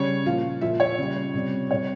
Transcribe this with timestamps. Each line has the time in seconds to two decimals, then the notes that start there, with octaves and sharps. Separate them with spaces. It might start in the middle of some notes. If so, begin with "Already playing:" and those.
Already playing: C#3 G3 C#5
0.26 A#2 F3 F5
0.61 A#2 F3 E5
0.80 C#5
0.98 C#3 G3
1.34 C3 G3
1.70 C3 G3 C#5